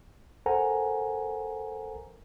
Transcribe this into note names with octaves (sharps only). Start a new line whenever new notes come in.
A4 A#4 C5 F#5 G#5 A#5